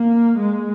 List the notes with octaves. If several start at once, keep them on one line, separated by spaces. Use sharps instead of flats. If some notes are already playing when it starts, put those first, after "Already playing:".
Already playing: A#3
G#3